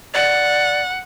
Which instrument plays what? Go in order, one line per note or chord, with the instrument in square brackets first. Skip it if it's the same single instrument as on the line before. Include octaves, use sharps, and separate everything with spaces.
[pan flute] D5 [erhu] F#5